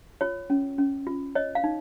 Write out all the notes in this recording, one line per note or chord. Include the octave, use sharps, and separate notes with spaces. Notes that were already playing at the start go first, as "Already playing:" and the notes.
F4 C#5
C#4
C#4
F4
C#5 D#5
F5
D#4